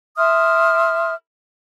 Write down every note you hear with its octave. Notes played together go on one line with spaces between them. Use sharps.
E5 C6 D#6 F6